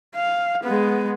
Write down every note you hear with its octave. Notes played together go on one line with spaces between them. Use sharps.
F5
G#3 B3